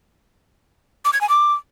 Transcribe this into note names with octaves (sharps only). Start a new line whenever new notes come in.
D6
G#6
G#5
D6